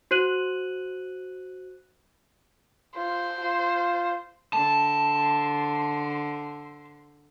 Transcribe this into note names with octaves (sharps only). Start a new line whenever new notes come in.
F#4 C5 F#6 D#7 F#7
F4 C5
F4
D3 C5 A5